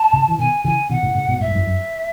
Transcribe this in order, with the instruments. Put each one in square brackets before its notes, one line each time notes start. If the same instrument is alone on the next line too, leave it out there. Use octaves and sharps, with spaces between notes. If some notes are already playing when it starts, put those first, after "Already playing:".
Already playing: [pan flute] A5
[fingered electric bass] A2 C#3
E3
[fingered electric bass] B2 D#3 [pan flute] G#5
[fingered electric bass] C#3 E3 [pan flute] G#5
[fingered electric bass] B2 D#3 [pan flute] F#5
[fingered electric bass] A2 C#3
A2 C#3
G#2 B2
[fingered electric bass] A2 [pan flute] E5
[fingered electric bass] G#2
F#2 A2
F#2